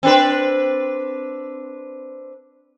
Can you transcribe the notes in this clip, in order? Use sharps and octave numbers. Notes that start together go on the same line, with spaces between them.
C4 D4 B4